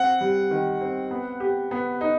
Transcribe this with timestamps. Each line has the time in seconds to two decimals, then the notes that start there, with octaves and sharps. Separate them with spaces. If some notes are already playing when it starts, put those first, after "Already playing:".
Already playing: C4 F#5
0.21 G3
0.51 D#3
0.81 C4
1.11 B3
1.40 G4
1.71 B3
2.01 D#4